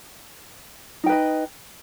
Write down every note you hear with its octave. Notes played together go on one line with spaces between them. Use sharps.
D#4 B4 D#5 G5